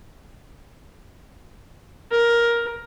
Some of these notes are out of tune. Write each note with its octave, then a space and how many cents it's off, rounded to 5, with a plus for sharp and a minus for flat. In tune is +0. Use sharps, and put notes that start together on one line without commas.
A#4 +10